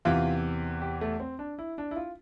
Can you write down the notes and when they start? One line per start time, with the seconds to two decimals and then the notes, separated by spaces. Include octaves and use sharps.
0.05 E2 C3 E3 F4
0.82 G4
1.01 A3
1.20 C4
1.39 D4
1.59 E4
1.78 D4
1.91 E4
1.96 F4